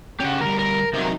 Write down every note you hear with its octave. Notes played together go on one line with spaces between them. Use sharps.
C#3 C#4 G4 F#5
D2 G3 A#4
A#4
C3 F#3 D#4 A#4